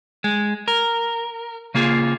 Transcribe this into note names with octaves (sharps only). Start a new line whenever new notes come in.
G#3
A#4
C#3 A#3 F4 G#4